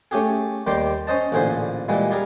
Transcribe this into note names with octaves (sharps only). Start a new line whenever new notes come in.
A3 C#4 G4 G#4
D#2 D#3 G3 G5 C6 D6
C#4 C5 D#5 A5
A1 A#2 D3 G#4 C5 B5
A#2 E3 G3 G#3
G3 G#4 A#4